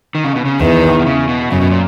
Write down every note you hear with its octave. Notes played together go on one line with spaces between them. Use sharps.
D#3
C#3
B2
C#3
E2 D#3
B2
C#3
B2
F#2 C#3
B2
A#2